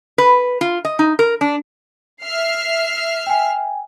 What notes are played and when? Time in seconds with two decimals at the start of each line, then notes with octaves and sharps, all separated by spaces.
0.18 B4
0.61 F4
0.85 D#5
0.99 D#4
1.19 A#4
1.41 D4
2.22 E5 F6 C7
3.27 G5 G#5